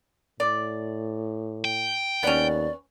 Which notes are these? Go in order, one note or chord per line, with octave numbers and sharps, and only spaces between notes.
A2 D5
G5
D#2 B3 C#4 D5